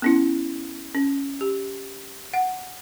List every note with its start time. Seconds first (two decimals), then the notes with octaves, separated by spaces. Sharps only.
0.02 B3 C#4 E4
0.95 C#4
1.41 G4
2.34 F#5